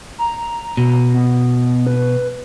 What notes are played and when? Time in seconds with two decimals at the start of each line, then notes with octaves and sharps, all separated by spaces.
0.19 A#5
0.77 B2
1.14 B3
1.87 B4